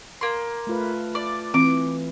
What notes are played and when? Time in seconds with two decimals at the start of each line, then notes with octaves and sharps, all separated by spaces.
0.21 A#3 C6
0.67 A3 F4 B4
1.15 D5
1.54 E3 C4 D6